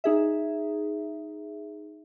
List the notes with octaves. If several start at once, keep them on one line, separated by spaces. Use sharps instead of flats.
D#4 G#4 E5